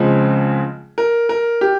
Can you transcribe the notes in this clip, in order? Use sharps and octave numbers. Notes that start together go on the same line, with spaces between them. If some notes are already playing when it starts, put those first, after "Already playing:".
Already playing: C#2 C#3 F3 G#3 C4
A#4
A#4
G4